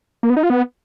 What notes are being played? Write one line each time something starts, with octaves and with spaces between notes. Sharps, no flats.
A#3
B3
D#4
F4
B3